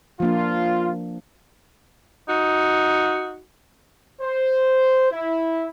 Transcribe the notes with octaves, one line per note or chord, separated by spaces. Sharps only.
F3 A#3 D4 F4
D#4 F#4
C5
E4